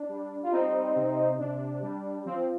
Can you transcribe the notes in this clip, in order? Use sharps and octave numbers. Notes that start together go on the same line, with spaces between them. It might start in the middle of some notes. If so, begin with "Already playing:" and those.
Already playing: D4
G3
F4
G3 C4 D#4
C3
C3 D4
G3
F3 C4